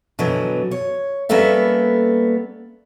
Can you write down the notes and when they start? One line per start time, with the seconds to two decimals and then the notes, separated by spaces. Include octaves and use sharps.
0.19 B2 D3 E3 F#3
0.71 C#5
1.29 G3 A#3 B3 C#4 A4 E5